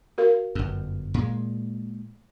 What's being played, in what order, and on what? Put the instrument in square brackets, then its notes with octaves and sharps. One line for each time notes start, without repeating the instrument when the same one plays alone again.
[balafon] F#4 A#4 F5
[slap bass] G1 F#2
A#2 G#3